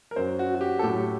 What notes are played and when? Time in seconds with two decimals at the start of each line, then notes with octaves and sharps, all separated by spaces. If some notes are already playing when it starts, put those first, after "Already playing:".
0.11 A#4
0.16 F#2 F#3 C5
0.39 F#4
0.55 F#4
0.61 G4
0.79 A4
0.83 A2 F#3 G4